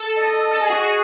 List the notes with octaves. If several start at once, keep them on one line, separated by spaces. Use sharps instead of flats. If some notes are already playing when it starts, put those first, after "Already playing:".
Already playing: A4
D#5
A4
G#4
F#4
G#4